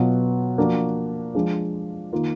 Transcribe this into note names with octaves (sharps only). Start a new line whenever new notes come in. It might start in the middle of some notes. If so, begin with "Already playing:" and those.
Already playing: B2 F#3 B3 F4
F3 A#3 D4 F#4
F3 G#3 D4
D#3 A#3 F4